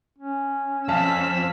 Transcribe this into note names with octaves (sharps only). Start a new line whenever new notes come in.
C#4
F2 F5 A5 E6 B6